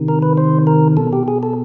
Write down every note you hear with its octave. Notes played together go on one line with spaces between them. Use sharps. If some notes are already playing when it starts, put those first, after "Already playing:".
Already playing: C3 D#3
A#4
B4
C5
A#4
B2 A4
G4
G#4
A4